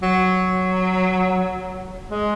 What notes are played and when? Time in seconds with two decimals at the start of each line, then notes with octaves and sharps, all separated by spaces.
0.03 F#3
2.11 G#3